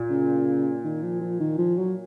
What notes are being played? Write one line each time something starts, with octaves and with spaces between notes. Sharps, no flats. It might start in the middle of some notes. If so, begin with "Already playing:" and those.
Already playing: A#2
C#3
D#3
F3
F3
D#3
F3
F#3